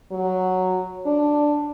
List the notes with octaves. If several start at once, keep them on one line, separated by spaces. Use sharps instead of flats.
F#3
D4